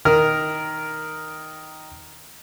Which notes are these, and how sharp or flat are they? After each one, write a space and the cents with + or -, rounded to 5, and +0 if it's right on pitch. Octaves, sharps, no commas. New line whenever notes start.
D#3 +0 A#4 +0